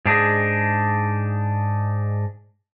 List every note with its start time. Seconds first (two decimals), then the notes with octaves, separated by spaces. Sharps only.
0.05 G#2 D4 D#4 G#4